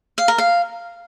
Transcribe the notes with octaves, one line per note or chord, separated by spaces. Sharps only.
F5
A#4
F5